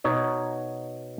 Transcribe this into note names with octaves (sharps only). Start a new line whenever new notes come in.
B2 D#4 C#5